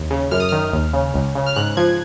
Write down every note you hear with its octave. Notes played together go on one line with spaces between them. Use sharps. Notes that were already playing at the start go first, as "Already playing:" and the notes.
Already playing: D#2
C#3
F#2 F6
D#6
D#3 F6
D#2
C#3
C#2
C#3
F6
G#2 F#6
F3 G#6